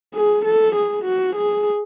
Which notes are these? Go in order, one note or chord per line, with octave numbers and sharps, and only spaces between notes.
G#4
A4
G#4
F#4
G#4